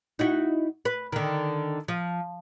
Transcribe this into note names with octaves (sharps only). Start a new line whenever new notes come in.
D#4 E4 F#4
B4
D3 D#3
F3